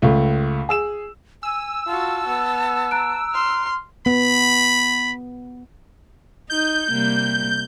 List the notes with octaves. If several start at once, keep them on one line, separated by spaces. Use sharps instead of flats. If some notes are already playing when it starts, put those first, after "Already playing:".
C#2 A3
G#4 E6 E7
G#5 E6
F4 F#4 A5
B3
A#5 F#6 D7
C6 F6
B3 B5
D#4 G6
C3 G3 A#3